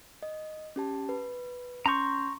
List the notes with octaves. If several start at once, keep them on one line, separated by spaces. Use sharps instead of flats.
D#5
C#4 G4 A5
B4
C#4 A#5 C6 C#6 G6